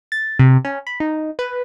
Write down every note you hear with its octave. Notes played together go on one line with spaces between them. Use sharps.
A6
C3
C#4
B5
D#4
B4